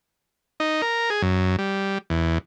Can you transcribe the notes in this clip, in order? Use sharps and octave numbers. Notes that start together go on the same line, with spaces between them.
D#4
A#4
G#4
F#2
G3
E2